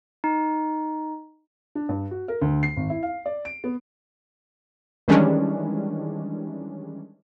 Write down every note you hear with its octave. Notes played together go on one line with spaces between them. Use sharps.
D#4
D4
G2
F#4
A#4
D2
C7
G#1
E4
F5
D5
D7
B3
D#3 E3 G3 G#3 C#4 D4